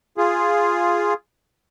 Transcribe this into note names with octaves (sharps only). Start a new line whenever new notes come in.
F4 G#4